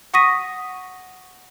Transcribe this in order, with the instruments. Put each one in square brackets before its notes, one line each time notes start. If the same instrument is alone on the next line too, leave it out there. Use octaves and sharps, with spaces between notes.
[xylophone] F#5 C#6 D#6 A#6 B6 D#7